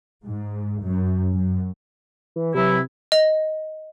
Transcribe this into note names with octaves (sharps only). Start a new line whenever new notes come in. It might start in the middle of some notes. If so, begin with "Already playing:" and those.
G#2
F#2
F#2
E3
C3 E3 F#3 E4
D#5